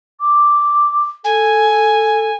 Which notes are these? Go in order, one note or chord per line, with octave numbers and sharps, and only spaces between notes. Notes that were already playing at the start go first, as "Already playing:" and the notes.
D6
A4 G#5